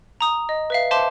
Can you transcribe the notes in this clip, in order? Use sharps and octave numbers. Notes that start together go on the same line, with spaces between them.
A#5 D#6
D#5
B4 E5 F5
C5 E5 F5 A5 C6 D6